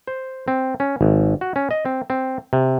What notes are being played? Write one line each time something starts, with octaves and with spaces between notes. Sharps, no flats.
C5
C4
C#4
G#1
F#4
C#4
D#5
C4
C4
C3